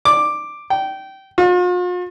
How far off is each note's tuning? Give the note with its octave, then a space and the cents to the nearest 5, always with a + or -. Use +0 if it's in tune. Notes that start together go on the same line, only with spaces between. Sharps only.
D6 +5
G5 -20
F4 +45